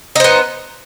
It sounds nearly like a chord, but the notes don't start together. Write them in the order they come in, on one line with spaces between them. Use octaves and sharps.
D#4 C5 B3